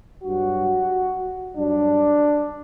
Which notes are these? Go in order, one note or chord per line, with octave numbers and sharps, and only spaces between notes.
G2 F#3 F#4
G2 F#3 D4